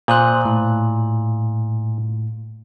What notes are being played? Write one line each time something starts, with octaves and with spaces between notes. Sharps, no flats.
A#2 C5 D#6 F#6
A2